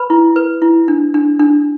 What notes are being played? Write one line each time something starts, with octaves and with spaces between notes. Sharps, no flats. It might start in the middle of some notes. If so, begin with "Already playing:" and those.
Already playing: B4 B5
E4
B4
E4
D4
D4
D4